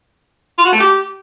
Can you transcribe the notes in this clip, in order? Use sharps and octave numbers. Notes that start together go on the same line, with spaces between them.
F4
F#4
A3
G4